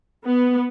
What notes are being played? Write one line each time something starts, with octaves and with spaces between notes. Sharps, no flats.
B3